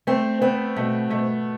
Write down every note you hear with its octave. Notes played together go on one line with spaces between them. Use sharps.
A3 C4
B3 C4
B2 A3
B2 A3